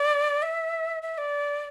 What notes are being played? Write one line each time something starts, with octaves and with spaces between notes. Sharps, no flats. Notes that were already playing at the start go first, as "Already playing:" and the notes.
Already playing: D5
E5
E5
D5